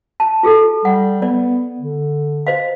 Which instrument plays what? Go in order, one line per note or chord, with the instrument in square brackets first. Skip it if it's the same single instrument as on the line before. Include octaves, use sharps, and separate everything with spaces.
[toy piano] A5
F4 G#4 A4
[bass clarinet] G3 [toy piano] F#5
[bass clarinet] B3 [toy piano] D5
[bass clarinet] D3
[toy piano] C5 D#5 F5